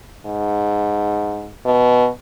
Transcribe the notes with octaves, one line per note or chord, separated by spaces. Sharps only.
G#2
B2